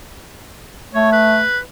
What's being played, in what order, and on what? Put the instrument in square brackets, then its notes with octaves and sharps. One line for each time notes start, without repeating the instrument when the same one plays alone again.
[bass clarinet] A3 [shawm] C#5
[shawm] B4